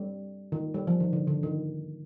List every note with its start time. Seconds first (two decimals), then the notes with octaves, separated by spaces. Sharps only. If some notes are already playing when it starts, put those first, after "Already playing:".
Already playing: G3
0.52 D#3
0.74 G3
0.87 F3
1.00 D#3
1.13 D3
1.27 D3
1.43 D#3